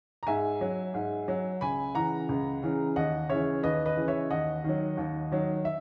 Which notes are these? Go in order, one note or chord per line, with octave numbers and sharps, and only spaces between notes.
A#5
G#2 E5 G#5
F#3
G#2
F#3
C#2 G#5 B5
C#3 E3 F#5 A#5
C#2
C#3 E3
D#2 D#5 F#5
C#3 E3 C#5 E5
D#2 B4 D#5
B4 D#5
C#3 E3
C#5 E5
D#2 D#5 F#5
D#3 F#3
D#2
D#3 F#3
E5